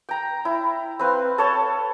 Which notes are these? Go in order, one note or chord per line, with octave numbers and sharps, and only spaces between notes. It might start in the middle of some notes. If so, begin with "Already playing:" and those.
G5 A#5
E4
C4 B4 F5
A4 C#5 A5